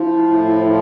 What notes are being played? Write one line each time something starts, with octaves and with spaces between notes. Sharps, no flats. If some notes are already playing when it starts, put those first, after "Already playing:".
Already playing: F3 E4
A2
F3